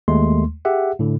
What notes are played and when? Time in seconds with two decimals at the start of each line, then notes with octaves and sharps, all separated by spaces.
0.08 D#2 G#3 A3 C6
0.65 G4 G#4 E5 F#5
0.99 A2 D3